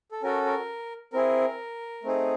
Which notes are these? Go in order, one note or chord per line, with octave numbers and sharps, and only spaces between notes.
A4
C#4 F#4 A4 A#4
A#4
C4 E4 G#4 A#4
A3 C4 D#4 G#4